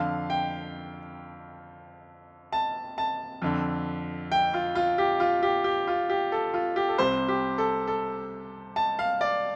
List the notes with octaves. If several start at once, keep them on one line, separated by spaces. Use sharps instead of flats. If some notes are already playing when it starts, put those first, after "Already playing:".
Already playing: F2 D3 F5
G5
A5
A5
F2 D3
G5
F4
F4
G4
F4
G4
G4
F4
G4
A4
F4
G4
A4
C2 C3 C5
G4
A4
A4
A5
F5
D5